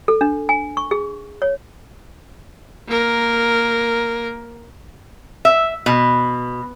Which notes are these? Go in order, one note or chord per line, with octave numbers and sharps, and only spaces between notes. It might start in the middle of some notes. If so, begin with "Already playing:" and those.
A4
D4
G#5
C#6
G#4
C#5
A#3 A#4
E5
B2